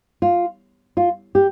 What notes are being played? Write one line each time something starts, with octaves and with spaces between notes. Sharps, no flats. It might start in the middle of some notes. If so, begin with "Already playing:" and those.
F4
F4
G4